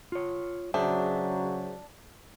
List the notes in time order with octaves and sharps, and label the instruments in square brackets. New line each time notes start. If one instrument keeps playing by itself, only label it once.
[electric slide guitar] F4 C#5
[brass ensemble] C#3 F#3 [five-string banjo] D4 [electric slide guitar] G#4 C5 E5